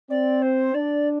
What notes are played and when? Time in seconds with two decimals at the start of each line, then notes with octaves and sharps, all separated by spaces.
0.10 C4 D5
0.42 C5
0.74 D4 D5